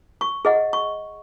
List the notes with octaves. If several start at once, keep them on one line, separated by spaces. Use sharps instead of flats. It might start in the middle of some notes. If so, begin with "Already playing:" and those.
C#6
G#4 D#5 F#5
C#6